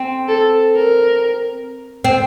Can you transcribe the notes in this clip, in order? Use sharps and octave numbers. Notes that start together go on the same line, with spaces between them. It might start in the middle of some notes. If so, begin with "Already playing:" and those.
Already playing: C4
A4
A#4
C4